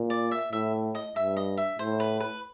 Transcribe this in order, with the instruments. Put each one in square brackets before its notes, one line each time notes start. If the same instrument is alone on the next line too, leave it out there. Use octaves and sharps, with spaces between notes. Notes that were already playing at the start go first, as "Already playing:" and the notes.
Already playing: [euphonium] A#2
[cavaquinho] D5
E5
[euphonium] A2 [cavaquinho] E5
[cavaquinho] D#5
[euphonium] G2 [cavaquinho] E5
[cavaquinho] D#5
E5
[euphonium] A2 [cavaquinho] C5
[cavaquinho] B4
B4